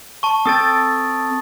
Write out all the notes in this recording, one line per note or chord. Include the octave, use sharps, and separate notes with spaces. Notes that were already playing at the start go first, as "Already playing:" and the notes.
A5 C#6
C4 A4 G5 D#6 A6